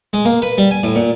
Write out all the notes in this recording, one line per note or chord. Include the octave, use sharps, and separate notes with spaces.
G#3
A#3
B4
G3
G#5
A2
A#2